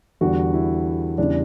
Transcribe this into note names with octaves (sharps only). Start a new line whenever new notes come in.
E2 D3 G3 F#4
E4
E2 C#3 E3 G3 D4